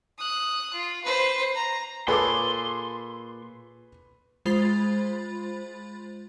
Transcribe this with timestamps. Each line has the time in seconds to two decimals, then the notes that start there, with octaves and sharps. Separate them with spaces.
0.18 D#6 F#6
0.73 F4
1.04 B4 C5
1.55 A#5
2.08 A#2 G#4 A4 B4 C#5 C6 D6
4.45 G#3 F4 C5 B5 A6